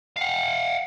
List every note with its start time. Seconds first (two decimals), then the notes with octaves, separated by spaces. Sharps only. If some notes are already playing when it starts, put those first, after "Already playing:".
0.17 F5 F#5